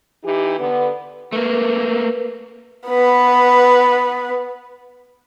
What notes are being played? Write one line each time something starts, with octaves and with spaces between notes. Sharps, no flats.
E3 D#4 G4
D3 B3
A3 A#3 A#4 B4
B3 B4